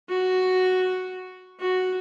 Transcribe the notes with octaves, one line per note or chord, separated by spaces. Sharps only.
F#4
F#4